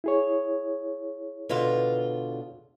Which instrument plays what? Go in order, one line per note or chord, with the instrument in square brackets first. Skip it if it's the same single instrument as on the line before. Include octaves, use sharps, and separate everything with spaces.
[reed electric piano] E4 G#4 C#5
[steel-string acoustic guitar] B2 D3 F4